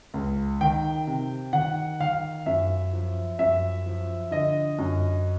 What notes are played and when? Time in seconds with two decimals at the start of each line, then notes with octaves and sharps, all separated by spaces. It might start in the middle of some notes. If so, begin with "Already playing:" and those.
0.14 C#2
0.61 D#3 G5
1.07 C3
1.53 D#3 F#5
2.00 D#3 F5
2.46 F#2 E5
2.93 F3
3.39 F#2 E5
3.86 F3
4.31 D3 D#5
4.79 F#2